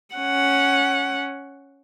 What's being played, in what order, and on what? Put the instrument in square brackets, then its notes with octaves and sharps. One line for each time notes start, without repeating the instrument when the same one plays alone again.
[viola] C#4 F#5